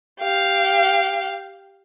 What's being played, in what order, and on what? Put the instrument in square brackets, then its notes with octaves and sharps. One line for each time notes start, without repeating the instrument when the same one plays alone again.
[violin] G4 F5